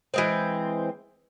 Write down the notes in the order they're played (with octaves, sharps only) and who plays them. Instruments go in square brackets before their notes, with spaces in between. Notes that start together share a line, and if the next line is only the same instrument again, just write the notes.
[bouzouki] E3 G#3 C4